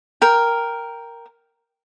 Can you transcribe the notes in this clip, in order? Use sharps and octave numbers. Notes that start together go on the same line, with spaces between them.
A#4 G5